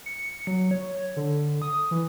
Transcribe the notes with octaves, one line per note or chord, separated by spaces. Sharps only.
C#7
F#3
C#5
D3
D#6
E3